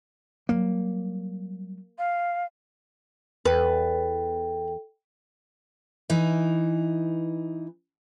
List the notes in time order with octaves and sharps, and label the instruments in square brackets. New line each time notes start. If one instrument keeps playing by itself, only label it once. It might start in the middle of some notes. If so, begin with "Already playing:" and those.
[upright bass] F#3 G3 [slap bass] A#3
[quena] F5
[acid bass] E2 [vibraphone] A4 G5 [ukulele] B4
[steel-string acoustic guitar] E3 D#4